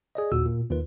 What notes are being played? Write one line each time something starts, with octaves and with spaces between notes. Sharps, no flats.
G#4 D5 D#5
G1 D#2 A#2 F#4 E6
A#2
D#2 D#3 F4 B4